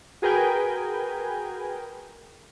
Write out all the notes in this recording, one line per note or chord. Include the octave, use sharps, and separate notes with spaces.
F#4 G#4 A#4 B4 G5 G#5